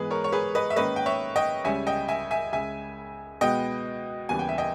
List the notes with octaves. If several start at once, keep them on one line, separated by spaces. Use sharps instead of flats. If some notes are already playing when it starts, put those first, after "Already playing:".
Already playing: G#2 E3 G#3 B3 G#4 B4
A#4 C#5
C#5
G#4 B4
B4 D#5
E5
G#2 D#3 A#3 C#4 B4 D#5
G5
C#5 E5
D#5 G5
C#2 C#3 G3 C#4 E5 G#5
D#5 G5
E5 G#5
E5 G#5
C#2 C#3 G#3 E5 G#5
B2 G#3 B3 D#5 G5
D#2 C#3 E3 G3 B3 G#5
G5
E5
D#5 G5